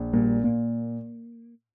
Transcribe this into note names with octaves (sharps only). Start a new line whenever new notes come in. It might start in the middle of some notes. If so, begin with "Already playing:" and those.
Already playing: A#1
A#2 G3
A#2 A#3